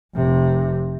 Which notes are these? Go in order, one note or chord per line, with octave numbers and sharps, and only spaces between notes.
F1 C3